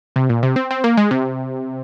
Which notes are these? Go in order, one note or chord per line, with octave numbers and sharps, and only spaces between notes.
C3
A#2
C3
C4
C4
A#3
G#3
C3